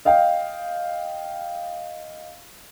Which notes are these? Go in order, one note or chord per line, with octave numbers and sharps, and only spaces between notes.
D#5 F5 G5